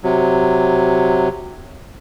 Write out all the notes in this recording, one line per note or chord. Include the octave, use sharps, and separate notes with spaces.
C3 F#3